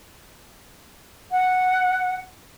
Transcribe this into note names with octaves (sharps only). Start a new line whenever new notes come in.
F#5